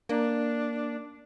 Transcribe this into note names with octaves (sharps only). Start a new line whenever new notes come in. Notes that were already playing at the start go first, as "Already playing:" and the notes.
A#3 D4